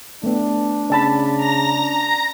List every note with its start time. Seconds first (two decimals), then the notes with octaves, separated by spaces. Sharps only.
0.23 A3 B3 D4
0.90 C#3 D5 A5 B5
1.36 A#5 A#6